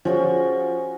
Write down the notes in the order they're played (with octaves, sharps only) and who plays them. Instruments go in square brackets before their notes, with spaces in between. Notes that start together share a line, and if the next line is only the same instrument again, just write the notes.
[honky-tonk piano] F3 [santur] C#4 F#4 G#4 [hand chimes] C5